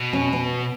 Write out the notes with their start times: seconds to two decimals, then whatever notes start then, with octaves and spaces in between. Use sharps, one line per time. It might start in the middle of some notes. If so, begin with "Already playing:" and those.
Already playing: B2
0.13 C#4
0.33 B3